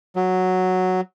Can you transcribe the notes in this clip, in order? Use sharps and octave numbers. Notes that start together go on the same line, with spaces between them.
F#3